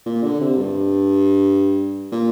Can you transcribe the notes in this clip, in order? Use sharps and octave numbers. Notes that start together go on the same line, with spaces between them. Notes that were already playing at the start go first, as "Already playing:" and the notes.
A#2
D3
C3
G2
A#2